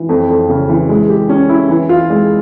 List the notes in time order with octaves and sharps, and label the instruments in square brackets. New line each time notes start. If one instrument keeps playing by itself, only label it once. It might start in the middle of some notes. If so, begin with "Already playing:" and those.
Already playing: [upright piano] E3
F2
F2
C#3
E3
G#3
G4
C#4
E4
E3
F4
G#3